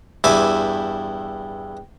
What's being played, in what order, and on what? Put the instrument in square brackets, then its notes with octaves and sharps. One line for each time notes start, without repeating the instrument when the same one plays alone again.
[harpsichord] E2 G2 E4 E5 G#5 D6